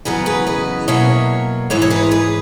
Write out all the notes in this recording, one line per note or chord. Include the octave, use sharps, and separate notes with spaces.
E2 C#3 F#3 G#4 B4
G#4 B4
B4 D#5
B2 F#3 A#3 C#5 E5
G#2 E3 G#3 C#5 E5
C#5
G#4 B4
G#4 B4